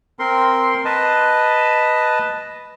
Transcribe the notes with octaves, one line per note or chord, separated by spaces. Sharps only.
C4 A#4 C6
B4 D#5 A5